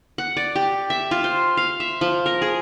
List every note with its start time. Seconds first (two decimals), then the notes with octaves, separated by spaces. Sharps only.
0.18 F#5
0.37 D5
0.56 G4
0.90 E5
1.11 F4
1.24 C5
1.57 F5
1.80 E5
2.01 F3
2.26 A#4
2.42 G#4